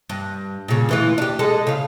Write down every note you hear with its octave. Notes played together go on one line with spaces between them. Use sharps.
G2
A#2 C#3
D2 E3 F4
D4 G4
G#3 A4
C#3 F5